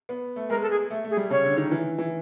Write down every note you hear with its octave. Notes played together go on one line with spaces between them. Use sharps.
B3
A3
G#3 A#4
A4
G#4
A3
A3
G#4
G3
C#3 C#5
D3
D#3
E3
E3